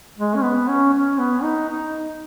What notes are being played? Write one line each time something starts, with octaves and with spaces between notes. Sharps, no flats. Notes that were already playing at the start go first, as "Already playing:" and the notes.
G#3
C#4
B3
C#4
C#4
B3
D#4
D#4